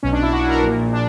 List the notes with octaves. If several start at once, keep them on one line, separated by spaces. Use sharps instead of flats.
B1 B2 C#4
D4
E4
F#4
A#4
A#1 A#2
D4